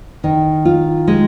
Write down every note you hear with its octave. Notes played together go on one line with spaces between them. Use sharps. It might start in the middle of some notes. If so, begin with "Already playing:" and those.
D#3
F4
G#3